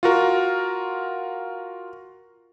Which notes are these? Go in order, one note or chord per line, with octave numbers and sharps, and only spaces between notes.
F4 F#4 A#4